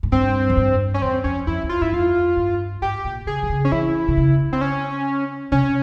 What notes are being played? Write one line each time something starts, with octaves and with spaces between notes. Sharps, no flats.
G#2
G2 C4
F2
G2
C#4
E2 C4
F2 C#4
F2 E4
E2
F2 F4
G2 E4
F2 F4
G2
G#2 G4
A#2
C#3 G#4
E3
C#3
C#4
E3 E4
C3
C#3
C4
C#4
C3 C#4